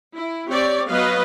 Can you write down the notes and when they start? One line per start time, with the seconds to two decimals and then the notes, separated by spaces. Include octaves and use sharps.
0.16 E4
0.51 C4 G4 C#5 D5
0.90 F#3 B3 B4 D#5 F5